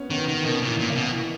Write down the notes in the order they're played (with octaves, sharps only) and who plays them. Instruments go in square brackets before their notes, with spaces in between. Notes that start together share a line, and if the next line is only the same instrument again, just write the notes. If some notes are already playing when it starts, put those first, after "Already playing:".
Already playing: [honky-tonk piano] B3 C#4
[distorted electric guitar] D#3 [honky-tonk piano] B3
[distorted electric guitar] D#3 [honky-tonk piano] B3
[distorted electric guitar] B2 [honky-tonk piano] D#3
[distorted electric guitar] A#2
[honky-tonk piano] E3
[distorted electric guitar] A#2
[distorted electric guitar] C#3 [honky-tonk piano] A#3
[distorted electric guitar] B2
[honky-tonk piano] E3